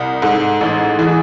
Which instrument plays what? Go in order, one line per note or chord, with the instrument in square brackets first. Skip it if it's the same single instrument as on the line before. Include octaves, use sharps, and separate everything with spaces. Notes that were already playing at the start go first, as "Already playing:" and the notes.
Already playing: [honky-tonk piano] C2
[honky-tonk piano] G#2 [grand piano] A4
[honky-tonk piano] A1 [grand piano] A4
[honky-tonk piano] E3 [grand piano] G#4